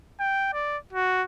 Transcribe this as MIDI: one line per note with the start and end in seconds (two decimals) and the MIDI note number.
0.20 0.50 79
0.53 0.77 74
0.93 1.23 66